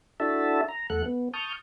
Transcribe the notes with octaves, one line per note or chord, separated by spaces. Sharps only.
D4 E4 F#4 A4 E5 A5
A#5
E2 A3 A4 F#5 F#6
B3
A5 C#6 D#6 F6 G6